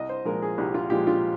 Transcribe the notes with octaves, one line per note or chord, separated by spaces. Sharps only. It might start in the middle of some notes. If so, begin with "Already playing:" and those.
Already playing: C2 D#5
C5
A#2 F3 G#3 A#4
G#4
C2 G4
F4
A#2 F3 G#3 G4
F4